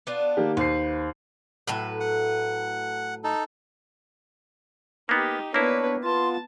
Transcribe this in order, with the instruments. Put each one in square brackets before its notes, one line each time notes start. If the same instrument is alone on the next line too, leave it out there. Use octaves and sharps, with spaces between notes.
[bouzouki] B3 D4 F4
[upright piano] D#3 A#3 G4
[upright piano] D#2 C5 C7 [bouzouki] B4
[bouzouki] A2 F#3 B4
[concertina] F#5
D#4 A4
[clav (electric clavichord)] A#3 B3 [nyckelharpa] D#4 G4
[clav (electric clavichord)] A#3 E4 [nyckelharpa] B3 B4 [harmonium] D4 C#5
[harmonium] B3 F4 [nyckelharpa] A5 [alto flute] C6